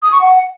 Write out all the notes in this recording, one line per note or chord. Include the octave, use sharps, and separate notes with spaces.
D#6
C#6
F#5